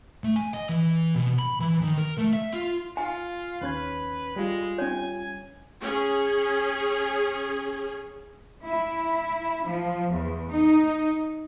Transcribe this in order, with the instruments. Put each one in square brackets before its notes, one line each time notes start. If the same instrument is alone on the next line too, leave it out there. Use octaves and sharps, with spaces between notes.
[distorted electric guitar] A3
G#5
D#5
E3
B2
B5
E3
D#3
A#4
A3
E5
F4
[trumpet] F4 [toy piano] G#5
[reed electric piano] D#2 C#4 G#6 [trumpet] B4
[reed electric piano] G3 F4 [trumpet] G#3
[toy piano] C#4 C#5 [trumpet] G#5
[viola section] C#4 G#4
[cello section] E4
F3
E2
D#4